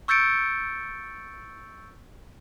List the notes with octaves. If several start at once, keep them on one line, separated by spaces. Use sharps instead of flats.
C#6 E6 G6 A6 C#7 D7